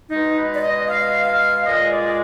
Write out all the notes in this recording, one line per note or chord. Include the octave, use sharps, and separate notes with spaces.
B2 G#3 D#4
B4
D5
D#5
F5
F5
A#2 G#3 D#5
D5